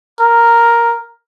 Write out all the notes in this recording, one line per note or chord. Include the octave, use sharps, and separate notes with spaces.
A#4